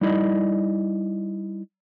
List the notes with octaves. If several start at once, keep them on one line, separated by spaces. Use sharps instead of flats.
G3 D#4 E4 D5 D#5